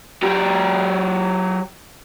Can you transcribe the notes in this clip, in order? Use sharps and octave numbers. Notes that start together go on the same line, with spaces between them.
F#3 G4